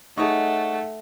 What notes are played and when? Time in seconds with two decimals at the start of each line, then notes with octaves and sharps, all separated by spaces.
0.18 A3 D#4 G#4 C#5 D#5 F#5 C#6